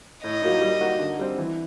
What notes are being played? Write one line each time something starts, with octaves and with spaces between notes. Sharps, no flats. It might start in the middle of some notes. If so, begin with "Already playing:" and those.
A2 D#5
F#3 A#3 D#4
G3
A#3 D#4 F#4
D3
G3 C4
E3